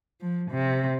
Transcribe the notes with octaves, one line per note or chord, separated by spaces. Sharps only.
F3
C3